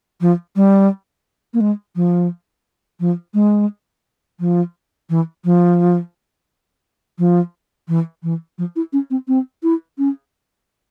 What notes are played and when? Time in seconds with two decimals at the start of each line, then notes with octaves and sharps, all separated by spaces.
0.21 F3
0.56 G3
1.54 A#3
1.61 G#3
1.96 F3
3.00 F3
3.34 G#3
4.40 F3
5.10 E3
5.45 F3
7.19 F3
7.88 E3
8.23 E3
8.58 F3
8.76 E4
8.93 C#4
9.10 C4
9.28 C4
9.63 E4
9.98 C#4